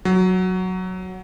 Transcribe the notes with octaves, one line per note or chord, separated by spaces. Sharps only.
F#3